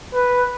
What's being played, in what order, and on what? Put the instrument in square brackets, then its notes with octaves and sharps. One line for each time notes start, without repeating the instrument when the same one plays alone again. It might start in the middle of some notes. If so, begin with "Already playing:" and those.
[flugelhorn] B4